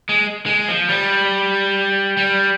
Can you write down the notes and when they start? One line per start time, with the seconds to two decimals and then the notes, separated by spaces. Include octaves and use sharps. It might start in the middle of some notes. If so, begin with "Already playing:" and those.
0.09 G#3
0.46 G#3
0.68 F3
0.89 G3
2.17 G3